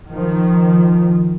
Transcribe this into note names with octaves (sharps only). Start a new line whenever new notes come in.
D#3 F3